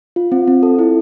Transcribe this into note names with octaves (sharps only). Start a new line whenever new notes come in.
F4
C4
C4
A4
E4